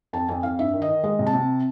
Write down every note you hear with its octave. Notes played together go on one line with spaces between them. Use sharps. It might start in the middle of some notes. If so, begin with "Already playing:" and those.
F2 A5
F2 G#5
F2 F5
G2 E5
D#3
D#5
D#3
G#3 D#5
C3
A5
C3